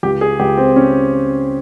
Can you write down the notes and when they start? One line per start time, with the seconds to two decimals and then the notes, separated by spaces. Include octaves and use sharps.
0.03 C#2 G4
0.21 G#4
0.39 C#2 G4
0.57 C4
0.76 C#4